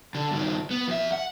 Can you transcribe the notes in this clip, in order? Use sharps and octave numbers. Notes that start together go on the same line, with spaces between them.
D3
G2 D#3
B3
F2 E5
F#5